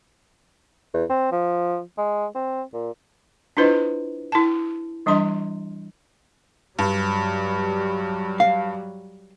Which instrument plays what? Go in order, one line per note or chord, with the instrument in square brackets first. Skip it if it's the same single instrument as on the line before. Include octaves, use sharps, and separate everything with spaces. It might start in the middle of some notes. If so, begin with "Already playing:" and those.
[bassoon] E2
C4
F3
G#3
C4
A#2
[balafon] D4 E4 F4 B4 C5 D#5
E4 A5
E3 G3 D4 D#5 C6
[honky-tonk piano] G2 [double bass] F#3 G3
[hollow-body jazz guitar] F5